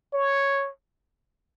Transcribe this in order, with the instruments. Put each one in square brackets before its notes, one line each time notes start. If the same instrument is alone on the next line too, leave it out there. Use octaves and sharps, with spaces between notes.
[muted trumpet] C#5